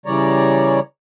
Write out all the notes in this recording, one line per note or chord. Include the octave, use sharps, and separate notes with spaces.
C#3 E3 G3 C#5 D5 A#5